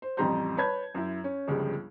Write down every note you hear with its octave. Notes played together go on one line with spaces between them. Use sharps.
C5
A1 F2 G3 A#5 C6 G6
B4 C#5 A5 B5 G6 G#6
F#2 E4
C#4
G1 C#2 C#3 F3 G3